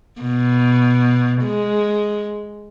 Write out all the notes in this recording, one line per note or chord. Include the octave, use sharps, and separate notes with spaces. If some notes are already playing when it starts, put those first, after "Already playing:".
B2
G#3